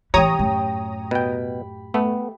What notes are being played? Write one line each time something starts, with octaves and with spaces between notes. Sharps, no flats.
A1 E3 G4 C#5 G5 A#5 D#6
F#2 A2
B2 G5 B5
A3 B3